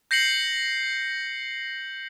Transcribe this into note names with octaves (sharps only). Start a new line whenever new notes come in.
G6 A#6 C7 C#7 F#7